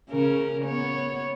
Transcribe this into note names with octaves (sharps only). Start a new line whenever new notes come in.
C#3 C#4 A#4
B3 C#5